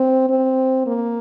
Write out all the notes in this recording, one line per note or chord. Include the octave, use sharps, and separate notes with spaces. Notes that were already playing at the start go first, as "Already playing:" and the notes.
Already playing: C4
C4
A#3